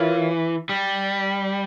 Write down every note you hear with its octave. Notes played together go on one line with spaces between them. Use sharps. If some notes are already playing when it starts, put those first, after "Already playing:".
Already playing: E3 F4 A#4 C#5 F5
G3